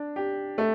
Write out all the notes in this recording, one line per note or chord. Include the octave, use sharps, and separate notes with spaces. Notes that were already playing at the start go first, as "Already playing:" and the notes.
Already playing: D4
G4
A3